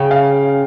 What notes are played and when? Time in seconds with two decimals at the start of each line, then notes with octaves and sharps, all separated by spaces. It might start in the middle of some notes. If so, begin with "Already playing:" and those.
Already playing: C#3 G5
0.11 F5